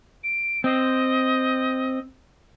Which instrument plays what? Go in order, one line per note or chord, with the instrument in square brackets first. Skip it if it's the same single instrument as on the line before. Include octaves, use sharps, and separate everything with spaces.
[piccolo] D7
[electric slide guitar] C4 [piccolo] D#5